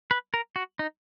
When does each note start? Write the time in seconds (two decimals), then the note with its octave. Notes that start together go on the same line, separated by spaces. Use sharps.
0.11 B4
0.34 A#4
0.56 F#4
0.79 D#4